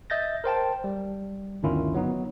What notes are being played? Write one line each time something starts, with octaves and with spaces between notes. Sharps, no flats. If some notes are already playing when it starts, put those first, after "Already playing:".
D#5 E5 G6 A6 A#6
A#4 C5 G5 A5
G3
G1 D2 D#3 C#4 E4 F4
F#3 B3 D#4